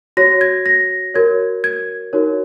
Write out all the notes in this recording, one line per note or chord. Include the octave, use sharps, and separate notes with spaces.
F#4 C#5 A#6
G#6
A#6
F#4 A#4 C#5 G#6
G#6
D#4 F#4 A#4 C#5